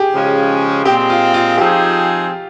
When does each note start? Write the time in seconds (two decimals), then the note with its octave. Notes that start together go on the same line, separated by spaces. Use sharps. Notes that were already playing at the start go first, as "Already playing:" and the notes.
Already playing: G4 G#4
0.14 C#3 F3 G#3 C#4
0.85 A#2 G#3 C4 G4
1.10 F4
1.34 F4
1.58 F3 C4 D#4 G4 G#4